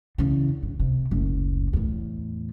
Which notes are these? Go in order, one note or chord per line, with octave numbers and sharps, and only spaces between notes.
E2 C#3
G2
C3
F#1 D2
E2 A2